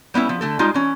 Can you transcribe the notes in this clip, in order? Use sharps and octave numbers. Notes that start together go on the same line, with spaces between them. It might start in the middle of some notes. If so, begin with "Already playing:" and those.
G3 B3 C#4 E4
F3
D3 A3 A4
G3 G#3 D#4 F4
E3 C#4